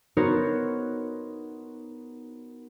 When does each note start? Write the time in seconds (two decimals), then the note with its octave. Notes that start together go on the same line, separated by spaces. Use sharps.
0.17 B3 D#4 F#4 A#4 C5 C#5